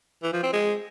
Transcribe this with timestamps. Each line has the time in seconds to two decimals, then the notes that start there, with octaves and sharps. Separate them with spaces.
0.23 E3
0.33 F3
0.43 C4
0.53 G#3